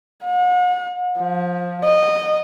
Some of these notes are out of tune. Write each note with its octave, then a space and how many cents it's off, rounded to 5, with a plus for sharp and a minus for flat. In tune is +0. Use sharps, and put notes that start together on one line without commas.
F#5 -40
F3 +15
D#5 -20